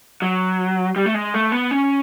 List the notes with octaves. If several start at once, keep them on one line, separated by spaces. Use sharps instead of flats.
F#3
G3
A3
G#3
A3
B3
C#4